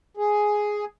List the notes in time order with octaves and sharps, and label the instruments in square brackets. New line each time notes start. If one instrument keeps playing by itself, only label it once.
[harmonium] G#4